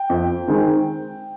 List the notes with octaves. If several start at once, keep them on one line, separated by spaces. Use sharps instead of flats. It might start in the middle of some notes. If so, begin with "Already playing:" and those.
Already playing: G5
F2
D#3 G#3 C4